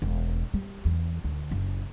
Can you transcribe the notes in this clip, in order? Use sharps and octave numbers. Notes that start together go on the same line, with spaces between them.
E1
G3
E2
D2
F#1